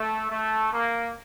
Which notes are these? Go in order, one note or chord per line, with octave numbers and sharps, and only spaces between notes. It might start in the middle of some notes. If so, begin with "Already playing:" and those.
Already playing: A3
A3
A#3